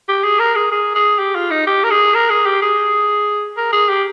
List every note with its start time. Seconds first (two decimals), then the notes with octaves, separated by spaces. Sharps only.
0.08 G4
0.24 G#4
0.39 A#4
0.56 G#4
0.72 G#4
0.95 G#4
1.19 G4
1.35 F4
1.51 D#4
1.67 G4
1.84 A#4
1.90 G#4
2.14 A#4
2.30 G#4
2.46 G4
2.62 G#4
3.57 A#4
3.72 G#4
3.89 G4